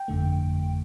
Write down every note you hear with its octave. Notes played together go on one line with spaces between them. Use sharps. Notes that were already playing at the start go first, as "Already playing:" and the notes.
Already playing: G5
G1 F2 D3 A3